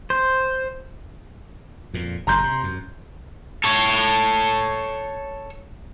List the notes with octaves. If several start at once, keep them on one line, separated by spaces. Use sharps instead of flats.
C5
F2 A#2
F#1 A#2 A#5 C6 G6
C3
F#2
A4 C#5